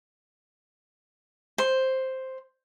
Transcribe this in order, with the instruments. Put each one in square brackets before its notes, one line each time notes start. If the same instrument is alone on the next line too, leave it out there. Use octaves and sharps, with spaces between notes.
[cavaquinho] C5